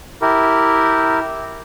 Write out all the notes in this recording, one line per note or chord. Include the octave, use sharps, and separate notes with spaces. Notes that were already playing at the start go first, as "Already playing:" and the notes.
E4 G4 A#4